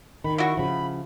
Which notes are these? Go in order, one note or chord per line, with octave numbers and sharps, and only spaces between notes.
D#3 B5
E4 F#4 C#6
C#3 F3 B5